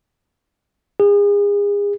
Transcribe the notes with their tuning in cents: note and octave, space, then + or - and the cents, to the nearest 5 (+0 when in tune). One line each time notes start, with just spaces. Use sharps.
G#4 -35